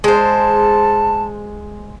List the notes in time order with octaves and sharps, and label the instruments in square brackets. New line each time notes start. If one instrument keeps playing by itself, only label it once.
[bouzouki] G#3 C5 [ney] A5